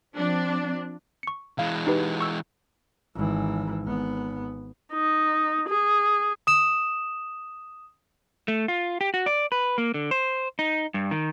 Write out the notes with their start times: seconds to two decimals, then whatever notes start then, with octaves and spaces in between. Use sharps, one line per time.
0.16 F3 C4 D4
1.23 C#6 C#7
1.59 E3 G#3 F5
1.87 D#4 G4 B4
2.21 C#6 E6
3.16 G#1 E3
3.84 G#1 B3
4.93 D#4
5.69 G#4
6.47 D#6 E7
8.48 A3
8.68 F4
9.01 G4
9.14 F#4
9.26 D5
9.52 B4
9.78 A#3
9.94 D3
10.11 C5
10.59 D#4
10.94 G2
11.11 D#3